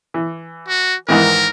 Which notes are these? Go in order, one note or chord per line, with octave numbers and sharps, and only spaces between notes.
E3
F#4
G#2 D#3 E3 A#4